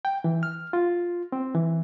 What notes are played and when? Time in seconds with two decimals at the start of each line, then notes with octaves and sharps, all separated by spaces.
0.05 G5
0.24 E3
0.43 F6
0.73 F4
1.32 C4
1.55 E3